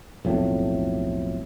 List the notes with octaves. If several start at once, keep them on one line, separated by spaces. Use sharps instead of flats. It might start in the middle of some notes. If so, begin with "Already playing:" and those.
B1 F2 A2